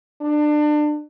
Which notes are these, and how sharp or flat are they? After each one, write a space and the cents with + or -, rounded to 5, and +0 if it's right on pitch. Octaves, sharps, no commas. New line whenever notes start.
D4 +30